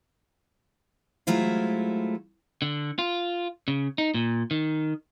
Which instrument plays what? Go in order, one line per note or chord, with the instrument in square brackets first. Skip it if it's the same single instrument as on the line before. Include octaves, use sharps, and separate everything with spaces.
[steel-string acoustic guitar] F#3 G#3 A3 E4 F4 C5
[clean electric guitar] D3
F4
C#3
D#4
A#2
D#3